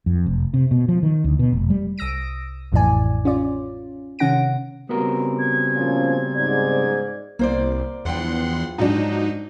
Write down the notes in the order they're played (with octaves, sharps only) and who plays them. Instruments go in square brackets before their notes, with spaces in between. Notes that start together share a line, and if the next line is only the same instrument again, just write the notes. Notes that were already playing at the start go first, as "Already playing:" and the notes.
[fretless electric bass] F2
F1
C3
B2
F3
D#3
D2
B2
F1
G3
[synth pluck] C2 D#6 E6 A#6 D7
A1 F2 A2 E3 D5 G#5
C#4 F4 D5
C3 D#3 C#4 F#5 A#6 D7
[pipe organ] C#3 G3 C4 [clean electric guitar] B3 F#4 A#4
[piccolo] G#6
[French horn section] A#2 F3 C#4
[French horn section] G#2 D5 [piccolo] G#6
[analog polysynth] C2 [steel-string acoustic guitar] A#3 C5 D5
[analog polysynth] E2 F#5 C6 [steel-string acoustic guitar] G2 F3 G5
[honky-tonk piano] G#2 F#3 D4 [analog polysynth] D#4